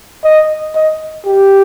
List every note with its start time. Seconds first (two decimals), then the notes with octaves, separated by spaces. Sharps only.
0.24 D#5
0.75 D#5
1.26 G4